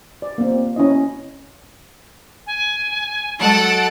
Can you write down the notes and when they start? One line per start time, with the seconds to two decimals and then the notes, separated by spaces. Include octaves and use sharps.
0.22 D5
0.38 A#3 C4
0.76 C#4 E4 D#5
2.47 G#5
3.40 F#3 G#3 A4 D#5 F#5 D7